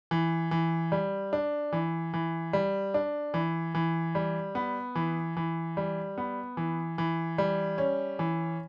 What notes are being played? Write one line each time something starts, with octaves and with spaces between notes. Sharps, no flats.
E3
E3
G3
D4
E3
E3
G3
D4
E3
E3
G3
B3
E3
E3
G3
B3
E3
E3
G3
C#4
E3